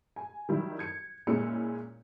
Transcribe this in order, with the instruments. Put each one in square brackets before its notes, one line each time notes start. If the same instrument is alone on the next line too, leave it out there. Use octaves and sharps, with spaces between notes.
[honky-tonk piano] G#5
D#3 F#3 G3 E4
G#6 C#7
A#2 G#3 C#4 E4 E6 C#7